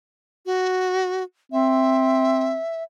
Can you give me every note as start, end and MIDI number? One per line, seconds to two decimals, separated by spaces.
0.46 1.23 66
1.52 2.58 60
1.52 2.83 76